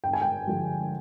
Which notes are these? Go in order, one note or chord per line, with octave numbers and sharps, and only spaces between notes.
G1 G5
G#5
G5
G2 D3 F3